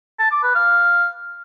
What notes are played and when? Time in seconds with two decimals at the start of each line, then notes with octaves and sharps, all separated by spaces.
0.19 A5
0.31 D6
0.43 B4
0.55 F5